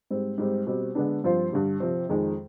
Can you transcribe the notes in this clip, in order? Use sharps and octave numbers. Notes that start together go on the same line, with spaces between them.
G#2 G3 C4
G#2 G3 C4
B2 G3 C4
D3 G#3 B3 D4
G2 F3 C4 F4 C5
G2 D3 G3
C3 F3 C4
F2 D#3 G#3